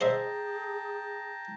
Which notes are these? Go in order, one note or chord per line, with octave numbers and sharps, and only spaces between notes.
G#4 C5 D#5 E5 G5 A5 A#5